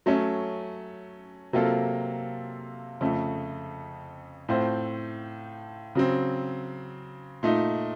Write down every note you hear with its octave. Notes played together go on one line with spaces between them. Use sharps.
F#3 A3 C#4
C3 F#3 A#3 F4 A4
F2 C#3 A3
A2 A3 C4 F4 C5
C#3 F#3 C4
A#2 A3 D#4